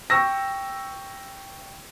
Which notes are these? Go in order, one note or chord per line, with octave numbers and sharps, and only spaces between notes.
G5 C#6 E6 A#6